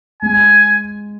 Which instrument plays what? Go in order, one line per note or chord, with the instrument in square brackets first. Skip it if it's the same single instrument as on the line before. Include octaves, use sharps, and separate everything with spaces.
[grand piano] G#3 [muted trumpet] G#5